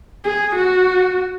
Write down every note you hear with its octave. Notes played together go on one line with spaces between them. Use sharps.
G#4
F#4